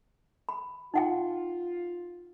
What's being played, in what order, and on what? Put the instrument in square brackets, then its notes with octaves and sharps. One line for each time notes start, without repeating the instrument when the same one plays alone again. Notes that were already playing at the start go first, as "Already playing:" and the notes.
[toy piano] B5
[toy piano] D#4 F#5 G5 [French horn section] F4